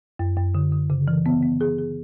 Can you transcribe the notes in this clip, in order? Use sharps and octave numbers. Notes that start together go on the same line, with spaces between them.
F#2
F#2
D3
D3
C#3
E3
B3
B3
G#4
G#4